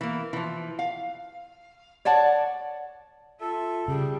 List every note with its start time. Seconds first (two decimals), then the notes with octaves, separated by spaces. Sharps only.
0.01 E3 A#3
0.33 E3 F3
0.79 F5
2.05 C#5 D5 F#5 A5
3.40 F4 A4 E5
3.88 C#3 G3 G#4